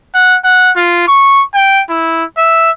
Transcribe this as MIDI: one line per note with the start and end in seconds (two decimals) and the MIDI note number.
0.15 0.37 78
0.44 0.71 78
0.76 1.03 65
1.08 1.44 85
1.55 1.83 79
1.90 2.24 64
2.38 2.70 76